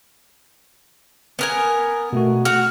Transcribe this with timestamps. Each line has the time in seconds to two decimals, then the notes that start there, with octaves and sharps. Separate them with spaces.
1.39 B3 A#4 G#5
2.13 B2 A3 F#4
2.45 F#4 F6